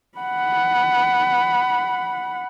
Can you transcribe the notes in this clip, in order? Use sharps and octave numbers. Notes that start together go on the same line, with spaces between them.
F#5 B5